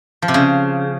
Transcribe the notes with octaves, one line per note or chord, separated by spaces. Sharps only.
F3
C3
C#3